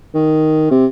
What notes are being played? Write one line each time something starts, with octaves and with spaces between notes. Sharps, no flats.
D#3
C3